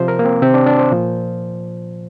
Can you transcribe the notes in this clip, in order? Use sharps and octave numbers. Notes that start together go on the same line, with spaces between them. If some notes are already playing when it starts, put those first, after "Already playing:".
Already playing: C3 F3 C5
A#4
A#3
C4
C3 D#3 C4
D4
D4
C5
A#2 F3